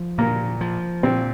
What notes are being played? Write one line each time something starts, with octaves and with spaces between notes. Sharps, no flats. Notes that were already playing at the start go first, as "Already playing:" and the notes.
Already playing: F3
A#2 A#3
F3
A#2 C4